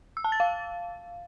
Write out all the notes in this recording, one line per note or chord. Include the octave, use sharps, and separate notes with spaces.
E6
A5
A6
F5